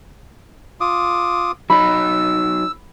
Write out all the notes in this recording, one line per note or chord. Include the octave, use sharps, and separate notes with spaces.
F4 D6 D#6
F#3 D#4 D#5 B5 E6